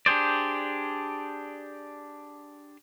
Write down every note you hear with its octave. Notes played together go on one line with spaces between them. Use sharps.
D4 G4 G#4 C5 D5